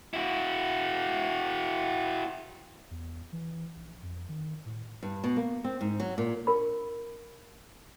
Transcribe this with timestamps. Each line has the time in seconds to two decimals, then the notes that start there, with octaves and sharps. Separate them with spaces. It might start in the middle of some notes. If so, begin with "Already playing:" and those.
0.14 E4 F#4
2.91 E2
3.33 E3
3.76 A#1
4.03 F2
4.29 D#3
4.66 A2
5.03 G2
5.24 B2
5.36 A#3
5.64 C4
5.81 G#2
6.00 F#3
6.18 A#2
6.47 D4 A#4 B5